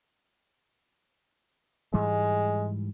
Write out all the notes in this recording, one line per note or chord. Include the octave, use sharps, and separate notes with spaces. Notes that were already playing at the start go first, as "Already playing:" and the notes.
G#2 E3 G3 G#3